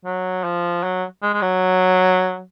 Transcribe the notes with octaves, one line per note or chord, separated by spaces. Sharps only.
F#3
F3
F#3
G#3
G#3
F#3